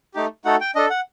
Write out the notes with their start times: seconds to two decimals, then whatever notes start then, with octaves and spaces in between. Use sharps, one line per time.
0.14 A3 D#4 G4
0.45 A3 D#4 F#4 A4 F#5
0.61 G5
0.75 D4 A4 D#5
0.90 F#5